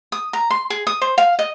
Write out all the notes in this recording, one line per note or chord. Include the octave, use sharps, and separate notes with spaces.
D#6
A#5
C6
G#4
D#6
C5
F5
D#5